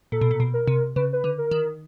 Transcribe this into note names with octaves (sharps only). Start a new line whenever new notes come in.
A#2 A4
B2
A#2
B2
A#4
C3
C#3 B4
B4
D3
A#4
D#3